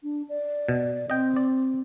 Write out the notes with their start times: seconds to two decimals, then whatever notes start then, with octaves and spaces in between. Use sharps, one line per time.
0.03 D4
0.29 D5
0.68 B2
1.10 C4 D#5 G5
1.36 D5